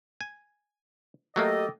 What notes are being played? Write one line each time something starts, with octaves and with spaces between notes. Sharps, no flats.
G#5
F#3 A3 A#3 G4 A4 D#5